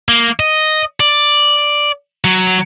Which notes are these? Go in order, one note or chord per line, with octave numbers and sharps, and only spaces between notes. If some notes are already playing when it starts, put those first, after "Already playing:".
A#3
D#5
D5
F#3